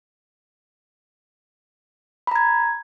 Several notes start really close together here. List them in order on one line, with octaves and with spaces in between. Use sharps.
B5 A#5 G#6